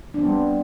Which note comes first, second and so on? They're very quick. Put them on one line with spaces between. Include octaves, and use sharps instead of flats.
D4 C4 B3 G3